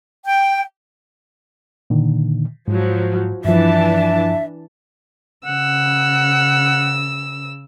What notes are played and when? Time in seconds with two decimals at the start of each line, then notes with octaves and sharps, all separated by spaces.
0.25 G5
1.90 A#2 D3 D#3
2.68 G#2 F3 F#3
3.45 G2 E3 F3 D4 E5 A5
5.46 C#3 F#5 E6